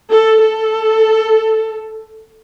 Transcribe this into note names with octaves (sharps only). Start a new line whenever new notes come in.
A4
A4